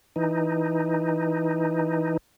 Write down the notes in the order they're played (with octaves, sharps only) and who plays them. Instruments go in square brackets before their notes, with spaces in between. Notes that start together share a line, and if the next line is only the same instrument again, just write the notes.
[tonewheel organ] E3 D#4